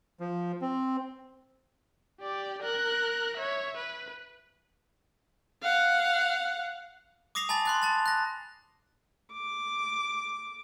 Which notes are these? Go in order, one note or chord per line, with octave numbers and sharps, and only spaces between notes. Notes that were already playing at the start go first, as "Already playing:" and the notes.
F3
C4
G4 D5
A#4 F#6
C#5 E5
B4
F5 F#5
D6 D#6 A#6 C7 F7
G#5 A5 B5 A6
C6 F#6 A6
A5 A6 F7
F#6 A#6
D6